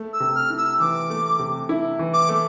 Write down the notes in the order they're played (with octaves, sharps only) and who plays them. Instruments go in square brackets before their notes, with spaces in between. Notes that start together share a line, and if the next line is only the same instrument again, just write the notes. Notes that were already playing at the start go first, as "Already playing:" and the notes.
Already playing: [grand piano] A3
[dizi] E6
[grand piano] C3
[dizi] F6
[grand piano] E4
[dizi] E6
[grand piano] E3 [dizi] D6
[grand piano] A3
C3
E4
E3
[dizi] D6
[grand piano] A3